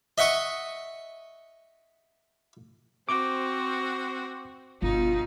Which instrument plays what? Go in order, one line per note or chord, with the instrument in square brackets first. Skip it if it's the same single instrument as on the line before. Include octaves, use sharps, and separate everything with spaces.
[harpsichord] D#5 E5 F#5 C#6 D#6
[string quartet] C4 F#4 C5 [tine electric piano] D6
[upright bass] G1 [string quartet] B2 D#4 [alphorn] F4